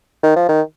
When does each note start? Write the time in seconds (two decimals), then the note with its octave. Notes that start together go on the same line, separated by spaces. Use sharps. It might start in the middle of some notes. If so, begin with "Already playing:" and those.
0.23 D#3
0.36 F3
0.49 D#3